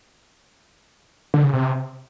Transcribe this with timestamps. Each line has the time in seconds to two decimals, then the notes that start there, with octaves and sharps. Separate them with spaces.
1.34 D3
1.44 C#3
1.54 C3